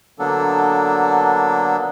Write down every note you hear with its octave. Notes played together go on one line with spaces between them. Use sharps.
D3 F#3 A#3 B3 D4 A4